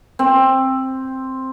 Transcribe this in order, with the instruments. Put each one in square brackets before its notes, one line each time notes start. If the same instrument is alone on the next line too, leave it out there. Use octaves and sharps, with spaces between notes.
[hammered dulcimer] C4